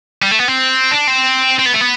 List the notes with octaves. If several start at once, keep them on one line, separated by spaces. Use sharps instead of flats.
G3
A3
B3
C4
D4
C4
C4
B3
A3
B3